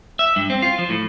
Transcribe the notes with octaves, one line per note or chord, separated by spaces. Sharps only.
E5
G2
C4
F4
F3
A2